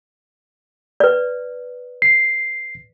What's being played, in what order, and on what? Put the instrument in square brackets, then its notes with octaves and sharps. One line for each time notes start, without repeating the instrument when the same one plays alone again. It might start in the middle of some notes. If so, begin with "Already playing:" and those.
[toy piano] B4 D5
[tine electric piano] C7